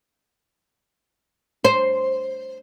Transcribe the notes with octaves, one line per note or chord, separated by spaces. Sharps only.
C5